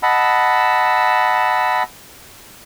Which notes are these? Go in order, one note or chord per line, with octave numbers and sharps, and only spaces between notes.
D#5 F#5 A5 B5 E6